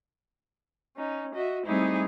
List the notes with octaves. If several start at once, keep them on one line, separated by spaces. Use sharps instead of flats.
C#4 D#4
F#4 D#5 E5
G3 A3 C4 D#4 E4 G#4